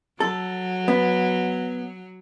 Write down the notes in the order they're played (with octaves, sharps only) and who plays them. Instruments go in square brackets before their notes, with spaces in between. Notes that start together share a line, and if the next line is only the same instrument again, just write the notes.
[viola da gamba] F#3 [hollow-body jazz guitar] A4
[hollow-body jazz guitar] B3